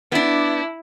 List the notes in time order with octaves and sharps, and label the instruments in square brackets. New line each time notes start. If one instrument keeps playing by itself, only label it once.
[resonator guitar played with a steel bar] B3 D4 [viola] E4